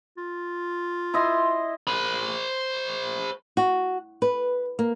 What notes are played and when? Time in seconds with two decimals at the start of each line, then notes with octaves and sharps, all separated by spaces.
0.18 F4
1.14 E4 D#5 C6
1.87 C5 B5
3.57 F#4
4.22 B4
4.79 A#3